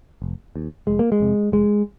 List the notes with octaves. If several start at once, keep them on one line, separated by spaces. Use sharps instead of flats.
F1
D#2
F1 G#3
A#3
G#3
F2 C3
F1 G#3